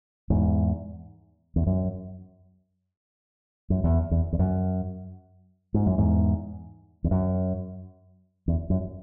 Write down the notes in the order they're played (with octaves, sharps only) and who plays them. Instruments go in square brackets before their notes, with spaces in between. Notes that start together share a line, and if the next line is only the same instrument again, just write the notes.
[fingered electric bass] E2 G#2
E2
F#2
F#2
E2
E2
E2
F#2
G#2
F#2
E2 G#2
E2
F#2
E2
F#2